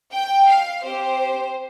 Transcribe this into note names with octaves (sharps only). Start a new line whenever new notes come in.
G5
F5
C4 G4 C5